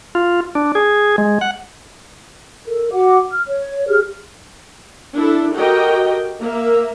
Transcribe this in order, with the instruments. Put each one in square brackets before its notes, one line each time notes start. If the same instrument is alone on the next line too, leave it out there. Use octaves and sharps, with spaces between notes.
[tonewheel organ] F4
D4
G#4
G#3
F#5
[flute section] A4 A#4
F#4 F#5 D6
F6
C#5
G4 G#4 F6
[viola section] D4 E4 A4
F#4 G4 A4 A#4 D#5 G5
A#3 E5